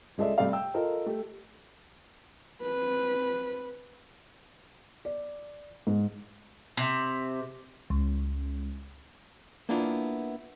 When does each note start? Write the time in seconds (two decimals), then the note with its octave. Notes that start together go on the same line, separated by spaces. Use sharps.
0.18 C#2 G#3 A4 D5 E5
0.38 C3 G3 A3 C4 D5 F5
0.53 G5 E6
0.74 F4 A4 A#4 D#5
1.06 A3 G4
2.62 C4 B4
5.05 D5
5.87 G#2
6.77 C3
7.90 C#2
9.69 A#3 B3 D4 E4 F4